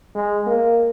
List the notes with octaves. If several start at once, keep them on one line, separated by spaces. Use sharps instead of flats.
G#3
A#3